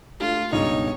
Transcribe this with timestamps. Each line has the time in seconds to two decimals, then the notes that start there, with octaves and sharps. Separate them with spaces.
0.20 A3 D4 F4 G4
0.52 C#2 G2 B2 D#4 C#5